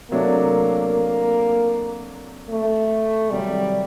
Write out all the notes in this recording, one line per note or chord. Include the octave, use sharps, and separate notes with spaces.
C3 F#3 A3 A#3 D4
A#3
A3
C3 D#3 F#3 G3